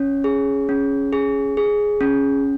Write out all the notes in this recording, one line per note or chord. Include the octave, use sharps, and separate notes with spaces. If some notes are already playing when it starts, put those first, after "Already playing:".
Already playing: C#4 C#5
G#4
C#4
G#4
G#4
C#4